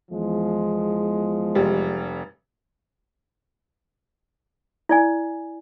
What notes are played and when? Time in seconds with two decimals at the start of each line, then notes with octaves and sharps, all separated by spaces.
0.12 E2 F3 G#3
1.55 F1 G3
4.89 E4 D5 G#5